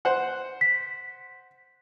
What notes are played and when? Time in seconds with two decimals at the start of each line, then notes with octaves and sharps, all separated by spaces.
0.05 C5 F#5
0.61 B6